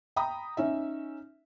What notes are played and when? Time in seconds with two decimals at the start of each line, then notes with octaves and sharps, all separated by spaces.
0.16 G5 A#5 B5 D#6
0.57 C#4 D#4 E5